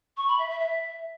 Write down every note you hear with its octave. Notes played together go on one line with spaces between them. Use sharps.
C#6
B5
E5
E5
E5